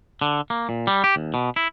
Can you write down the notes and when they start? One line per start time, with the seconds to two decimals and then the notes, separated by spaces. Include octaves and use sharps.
0.21 D3
0.50 A#3
0.69 A#2
0.87 G3
1.04 G4
1.16 D#2
1.34 B2
1.56 E4